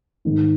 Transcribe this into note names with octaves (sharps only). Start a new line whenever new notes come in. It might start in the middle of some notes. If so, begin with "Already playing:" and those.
G#2 D#3